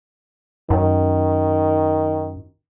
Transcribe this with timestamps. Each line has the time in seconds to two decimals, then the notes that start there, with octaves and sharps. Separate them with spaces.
0.70 F#2 D#3